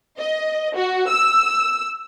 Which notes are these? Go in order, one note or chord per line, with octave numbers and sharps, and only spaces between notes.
D#5
F#4
E6